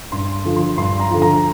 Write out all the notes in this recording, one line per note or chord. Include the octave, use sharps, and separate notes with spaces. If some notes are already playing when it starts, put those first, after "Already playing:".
G2 C6
D3 F3
C6
G2 C6
A#5
D3 F3
A#5